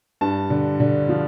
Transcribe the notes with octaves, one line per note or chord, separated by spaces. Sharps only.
G2 A5
D3
D3
F3